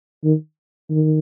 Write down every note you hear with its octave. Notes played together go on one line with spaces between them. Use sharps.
D#3
D#3